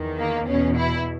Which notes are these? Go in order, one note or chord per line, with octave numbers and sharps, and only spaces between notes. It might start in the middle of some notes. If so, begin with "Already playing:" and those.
Already playing: E2 D#3
A#3
E2 B2 C#4
E4